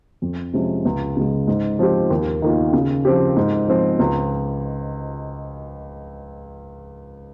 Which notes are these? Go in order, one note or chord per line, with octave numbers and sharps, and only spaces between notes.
F2
C3 F3 G#3 C#4
C#2
C#3 G#3
G#2
F3 C4 G4
D#2
D#3 A#3 F4
C#3
F3 C4 G4
G#2
F3 C4
C#2